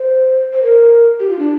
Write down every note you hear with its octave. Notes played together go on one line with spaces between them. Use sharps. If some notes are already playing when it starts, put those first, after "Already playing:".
Already playing: C5
C5
A#4
G4
F4
D4